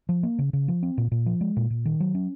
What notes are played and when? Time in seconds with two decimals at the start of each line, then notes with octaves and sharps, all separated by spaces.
0.09 F3
0.23 A#3
0.39 C#3
0.53 C#3
0.68 F3
0.83 C4
0.98 A#2
1.11 A#2
1.26 F3
1.41 G#3
1.57 A#2
1.70 A#2
1.85 D#3
2.00 F#3
2.15 C#4